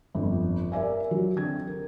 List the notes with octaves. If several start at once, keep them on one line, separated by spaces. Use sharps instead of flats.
G1 F2
A#4 D5 E5 G#5
F#3
D3 C4 G#6
A#4